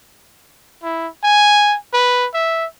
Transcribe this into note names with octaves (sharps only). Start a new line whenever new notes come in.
E4
G#5
B4
E5